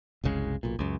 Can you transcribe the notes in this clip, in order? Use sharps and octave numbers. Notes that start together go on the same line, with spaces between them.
F#1 C2 C#3 G#3
B1 A#2
C#2 F#2